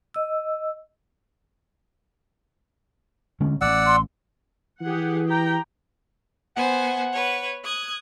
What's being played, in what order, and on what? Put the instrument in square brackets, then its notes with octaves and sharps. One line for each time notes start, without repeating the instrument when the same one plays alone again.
[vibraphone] D#5 E6
[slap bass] D3 G#3 C#4
[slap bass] A1 [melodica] D5 F#5 E6
[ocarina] C6
[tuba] E3 [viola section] G4 G#4 F#5
[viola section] G4 G5 A#5
[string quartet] B3 C5 G#5 [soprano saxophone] F#5
[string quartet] B4 C#5
D#6 F#6 G#6